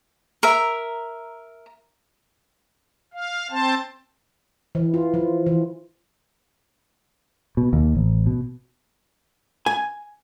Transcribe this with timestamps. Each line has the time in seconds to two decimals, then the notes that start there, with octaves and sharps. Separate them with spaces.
0.43 A#4 E5
3.13 F5
3.50 C4 C5 A5
4.75 E3
4.94 F4
5.14 F3
5.46 E3
7.57 B2
7.73 D#2
7.95 A1
8.26 B2
9.66 G#5